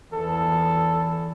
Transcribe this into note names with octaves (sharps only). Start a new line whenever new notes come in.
E2 E3 A4